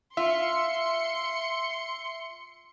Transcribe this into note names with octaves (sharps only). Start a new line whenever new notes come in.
F4 E5 C6 C#7